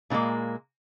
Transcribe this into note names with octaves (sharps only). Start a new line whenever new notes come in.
A#2 D#3 F3 G#3 A#3